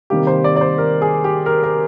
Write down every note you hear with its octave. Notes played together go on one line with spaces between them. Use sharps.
C3 D#3 G3 A#3 G4
C5
D5
D5
C5
A#4
G#4
G4
A#4
A#4